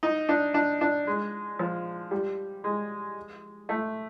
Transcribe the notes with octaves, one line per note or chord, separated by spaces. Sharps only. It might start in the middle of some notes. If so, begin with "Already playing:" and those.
D#4
D4
D4
D4
G#3
F3
G3
G#3
A3